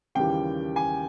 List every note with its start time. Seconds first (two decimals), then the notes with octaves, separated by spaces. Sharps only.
0.15 D#2 C#3 E3 G3 G5
0.76 G#5